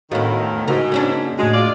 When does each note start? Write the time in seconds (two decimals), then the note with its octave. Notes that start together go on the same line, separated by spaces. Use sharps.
0.11 D2 A2 D#3 B3 F#4 A#4 F5
0.68 G#2 C#3 F#4 A#4
0.92 A#3 C#4 D4
1.39 A2 G#3 A3 F#4
1.54 F4 D5